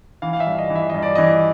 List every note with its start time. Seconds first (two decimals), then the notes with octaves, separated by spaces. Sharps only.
0.22 E3 F5
0.33 F5
0.40 E5
0.47 G2
0.59 D#5
0.70 E3
0.76 E5
0.90 G2 D#5
1.02 D5
1.15 E3 D#5